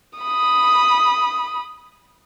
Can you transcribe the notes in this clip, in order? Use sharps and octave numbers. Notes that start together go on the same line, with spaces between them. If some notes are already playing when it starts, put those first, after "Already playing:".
B5 D#6